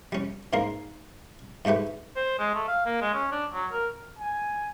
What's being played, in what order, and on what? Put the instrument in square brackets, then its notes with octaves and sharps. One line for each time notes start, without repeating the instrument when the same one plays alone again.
[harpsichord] G3 C#4
G#2 A#3 A#4 C6
G#2 G#3 A3 G4 B4
[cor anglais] C5
G#3
A3
F5
A#3
G#3
C#4
D4
F#3
A#4
[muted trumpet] G#5